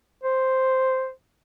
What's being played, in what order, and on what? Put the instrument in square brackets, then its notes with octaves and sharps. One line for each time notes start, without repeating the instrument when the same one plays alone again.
[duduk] C5